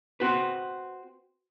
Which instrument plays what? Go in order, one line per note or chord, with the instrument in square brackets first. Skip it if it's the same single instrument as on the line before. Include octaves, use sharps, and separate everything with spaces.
[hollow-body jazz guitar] C4 F#4 B4